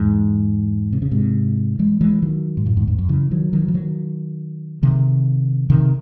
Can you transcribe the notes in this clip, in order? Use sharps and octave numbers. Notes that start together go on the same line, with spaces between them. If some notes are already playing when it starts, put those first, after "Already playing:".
Already playing: E2 G#2
C3
C#3
G#2 C3
E3 G#3
E3 G#3
D#3 F#3
G#2
F#2 A2
E2 G#2
E2 G#2
F#2
C#3 E3
D#3 F#3
D#3 F#3
E3
D#3 F#3
C3 D#3
C3 D#3